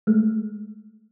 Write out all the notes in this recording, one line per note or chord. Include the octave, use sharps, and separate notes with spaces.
G#3 A3